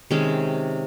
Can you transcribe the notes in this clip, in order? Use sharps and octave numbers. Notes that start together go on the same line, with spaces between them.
C3 D#3 G#3 C#4